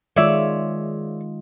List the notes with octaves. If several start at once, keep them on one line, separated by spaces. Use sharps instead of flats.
D#3 G#3 F4 C#5 D5 E5